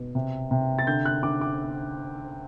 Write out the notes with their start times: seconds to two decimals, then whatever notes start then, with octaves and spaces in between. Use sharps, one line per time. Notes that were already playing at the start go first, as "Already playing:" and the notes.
Already playing: B2
0.15 C3
0.51 C3
0.79 A6
0.87 D3 G6
1.05 F#6
1.23 D3 D6
1.41 D6